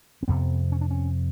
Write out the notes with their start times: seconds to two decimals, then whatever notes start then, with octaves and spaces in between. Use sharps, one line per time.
0.23 C4
0.28 F2 C3 B3
0.72 C#4
0.81 D4
0.91 C#4